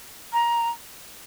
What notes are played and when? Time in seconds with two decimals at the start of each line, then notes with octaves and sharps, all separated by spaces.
0.33 A#5